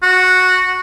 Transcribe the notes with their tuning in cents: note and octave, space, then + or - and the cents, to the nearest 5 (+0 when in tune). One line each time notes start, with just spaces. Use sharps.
F#4 -5